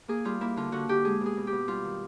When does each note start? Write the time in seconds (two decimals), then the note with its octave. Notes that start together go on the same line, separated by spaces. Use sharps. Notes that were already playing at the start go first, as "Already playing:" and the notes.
0.08 A#3 G#4
0.25 G3 F4
0.41 A#3 E4
0.56 D3 F4
0.72 D3 F#4
0.88 D3 G4
1.05 G#3 G#4
1.21 B2
1.26 G#4
1.37 B2
1.47 G4
1.52 B2
1.68 G3 F4
1.84 D#3